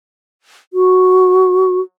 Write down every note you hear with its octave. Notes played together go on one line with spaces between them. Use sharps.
F#4